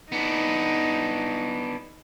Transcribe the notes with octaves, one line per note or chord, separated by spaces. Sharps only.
B3 D4 D#4